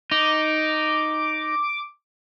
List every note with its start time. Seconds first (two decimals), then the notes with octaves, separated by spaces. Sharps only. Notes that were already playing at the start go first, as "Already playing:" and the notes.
0.11 D#4 D6